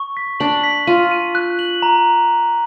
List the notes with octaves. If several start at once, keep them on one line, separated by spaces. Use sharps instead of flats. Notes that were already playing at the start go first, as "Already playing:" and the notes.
Already playing: C#6
B6
D4 F#7
B6
F4 D#7
D#7
F#6
F#7
A#5